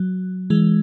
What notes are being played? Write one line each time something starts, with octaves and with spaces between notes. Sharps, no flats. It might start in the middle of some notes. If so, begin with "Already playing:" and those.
Already playing: F#3
E3 G#3